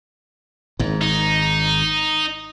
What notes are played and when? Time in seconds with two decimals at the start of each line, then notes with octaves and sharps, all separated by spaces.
0.79 G#1 G#2
1.01 D#4